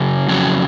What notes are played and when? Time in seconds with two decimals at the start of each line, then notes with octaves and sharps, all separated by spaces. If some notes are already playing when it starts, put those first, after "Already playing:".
Already playing: C#3 F#3
0.28 F2 C#3 F#3